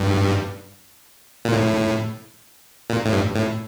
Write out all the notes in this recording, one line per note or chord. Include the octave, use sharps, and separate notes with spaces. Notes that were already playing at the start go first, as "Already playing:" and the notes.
Already playing: G2
A#2
A2
A#2
A2
G2
A2